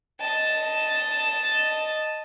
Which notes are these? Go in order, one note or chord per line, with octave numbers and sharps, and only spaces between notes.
D#5 A5